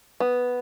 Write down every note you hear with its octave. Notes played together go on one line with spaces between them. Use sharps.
B3